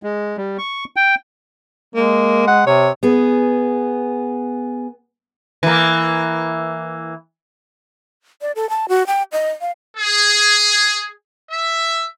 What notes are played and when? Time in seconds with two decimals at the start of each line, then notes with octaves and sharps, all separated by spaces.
0.03 G#3
0.37 G3
0.58 C#6
0.96 G5
1.95 G#3 A#3
2.47 F#5
2.67 C3 C#5
3.03 B3 G#4
5.63 E3 A#3
8.42 D5
8.56 A4
8.70 A5
8.89 F#4
9.07 G5
9.32 D#5
9.61 F5
9.97 G#4
11.50 E5